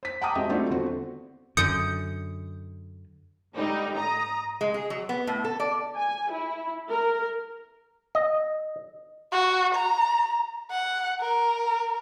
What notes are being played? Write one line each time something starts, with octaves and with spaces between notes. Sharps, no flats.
C5 B6
F#5 G5 A5 A#5 D6 D#6
G#3 C4 F#4 G4 D#5 E5
G3 A3 C4 D4 F4 F#4
E2 D3 C4 F#4 C5
F#2 D3 D#6 G6 C#7
G#2 D3 G3 D#4
A#5 D#6 A#6
G#3
G#4
F#3
B3
A2
A4
D5
G#5
E4
A#4
D#5
F#4
A#5
F#5
A#4